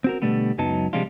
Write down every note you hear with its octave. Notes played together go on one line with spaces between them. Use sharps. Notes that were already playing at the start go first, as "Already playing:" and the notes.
C4 F#4 A#4
B2 D3 G3 A3 B3
C#2 F#2 F#3 B3 D#4 A5
C3 F3 G3 G#3 D4 F4